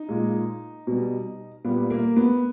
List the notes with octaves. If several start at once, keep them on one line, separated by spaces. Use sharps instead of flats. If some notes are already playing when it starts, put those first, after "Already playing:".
Already playing: D#4
A#2 G#3
B2 G3
A#2 G3 B3
A#3
B3